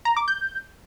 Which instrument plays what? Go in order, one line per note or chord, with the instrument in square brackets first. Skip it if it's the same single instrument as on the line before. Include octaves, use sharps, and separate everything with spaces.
[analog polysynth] A#5
D6
G6